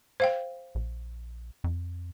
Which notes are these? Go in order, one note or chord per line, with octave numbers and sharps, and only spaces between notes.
C5 F5 G5
A#1
F2